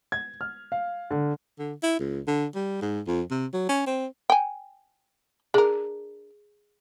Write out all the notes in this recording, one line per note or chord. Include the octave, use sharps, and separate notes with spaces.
G#6
F6
F5
D3
D3
E4
C#2
D3
G3
G#2
F2
C3
F#3
C#4
C4
G5 G#5
D4 G#4 A#4